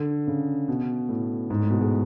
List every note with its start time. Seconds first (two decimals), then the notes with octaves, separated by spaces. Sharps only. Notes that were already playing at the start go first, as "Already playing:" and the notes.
Already playing: D3
0.27 C#3
0.68 B2
1.09 A2
1.50 G#2
1.60 A2
1.70 B2
1.81 G#3